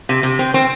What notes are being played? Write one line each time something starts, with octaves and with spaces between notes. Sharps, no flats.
C3
C3
C4
C4